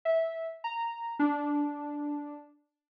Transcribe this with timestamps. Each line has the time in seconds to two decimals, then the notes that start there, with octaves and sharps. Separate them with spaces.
0.05 E5
0.64 A#5
1.19 D4